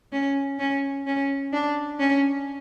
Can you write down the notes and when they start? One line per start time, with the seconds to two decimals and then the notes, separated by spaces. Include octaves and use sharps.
0.12 C#4
0.59 C#4
1.06 C#4
1.53 D4
1.99 C#4